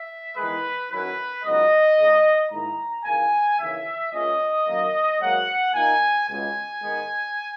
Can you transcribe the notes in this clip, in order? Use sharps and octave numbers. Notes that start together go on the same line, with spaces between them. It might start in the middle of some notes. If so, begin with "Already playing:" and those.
Already playing: E5
E2 D#3 G#3 B4
F#2 D#3 F#3 C#4 E4 B4
C#2 C#3 F#3 B3 D#4 D#5
C#3 G#3 D#4
G#2 D#3 A#3 E4 A#5
D#2 C#3 E3 A#3 G#5
D#2 C#3 E3 E5
A#2 G#3 C#4 D#5
F#2 D#3 A#3
G#2 F#3 A#3 F#5
A#2 A#3 D#4 G#5
C#2 B2 G#3 G#5
G#2 D#3 G#3 B3